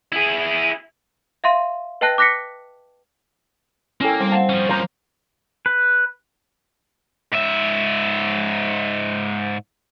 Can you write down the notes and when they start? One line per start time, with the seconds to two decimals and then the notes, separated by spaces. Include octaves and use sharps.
0.12 E4 G#4
1.44 E5 F5 C6 D#7
2.01 B4 D#5 G5 A5 F#6 A#6
2.18 D6 F#6 A#6 B6 C#7
4.01 A#3 C#4 E4 A4 G5
4.20 G3 C4
4.32 F5 F#5 A5
4.49 F3 C#4
4.69 A#3 C5 A#5
5.66 B4
7.32 G#2 E5